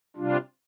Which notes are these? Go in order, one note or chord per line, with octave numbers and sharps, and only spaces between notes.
C3 G3 D4 F4